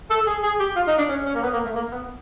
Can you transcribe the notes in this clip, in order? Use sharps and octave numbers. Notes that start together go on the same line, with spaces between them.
A4
G#4
G#4
G4
F4
D#4
D4
C#4
C#4
A#3
B3
A#3
A3
A#3
B3